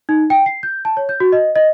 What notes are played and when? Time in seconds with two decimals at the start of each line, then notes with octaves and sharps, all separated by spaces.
0.09 D#4
0.30 G5
0.46 C7
0.63 G6
0.85 A5
0.97 C#5
1.09 G6
1.20 F#4
1.32 D#5
1.56 D#5